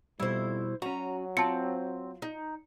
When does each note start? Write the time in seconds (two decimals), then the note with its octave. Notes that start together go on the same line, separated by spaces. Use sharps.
0.20 F2 B2 G3 E4 C5
0.82 F#3 C#4 F#4 A#5
1.37 C4 F4 A5 C#7
2.22 D#4